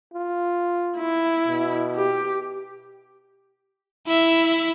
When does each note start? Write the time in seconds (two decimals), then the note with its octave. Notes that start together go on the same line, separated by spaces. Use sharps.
0.14 F4
0.98 E4
1.47 B2
1.96 G4
4.07 E4 E5